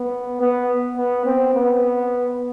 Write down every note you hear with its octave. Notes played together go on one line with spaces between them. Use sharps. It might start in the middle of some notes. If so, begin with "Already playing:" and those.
Already playing: B3
B3
B3
C4
B3